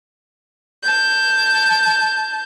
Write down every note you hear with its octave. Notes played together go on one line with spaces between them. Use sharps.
A5 G6